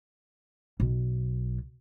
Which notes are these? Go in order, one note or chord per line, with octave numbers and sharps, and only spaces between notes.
B1